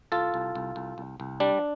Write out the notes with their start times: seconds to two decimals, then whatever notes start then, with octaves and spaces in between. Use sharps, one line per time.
0.12 C2 F4 A4
0.34 C2
0.55 C2
0.76 C2
0.98 C2
1.20 C2
1.40 G3 D4